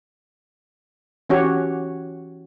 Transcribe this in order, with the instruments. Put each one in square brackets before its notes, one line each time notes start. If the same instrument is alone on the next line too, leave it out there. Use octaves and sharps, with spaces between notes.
[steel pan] E3 C#4 F#4 G4 C#5